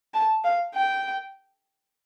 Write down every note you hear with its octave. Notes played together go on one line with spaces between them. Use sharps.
A5
F5
G5